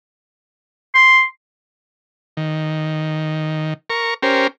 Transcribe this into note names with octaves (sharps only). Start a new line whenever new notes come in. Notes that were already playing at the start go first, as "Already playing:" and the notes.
C6
D#3
A#4 C#6
C#4 G4 A#4 C5